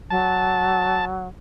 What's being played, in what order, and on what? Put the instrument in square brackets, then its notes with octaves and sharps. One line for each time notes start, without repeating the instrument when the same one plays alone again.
[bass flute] F#3 [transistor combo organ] A5